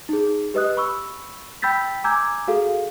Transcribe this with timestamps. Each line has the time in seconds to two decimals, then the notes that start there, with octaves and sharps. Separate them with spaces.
0.09 D#4 G#4
0.54 G4 B4 D#5 D#6 F#6
0.77 B5 C#6 E6
1.62 G5 B5 E6 G6 A6 B6
2.04 G#5 A#5 D6 E6 G6 G#6
2.48 F#4 G#4 A4 F5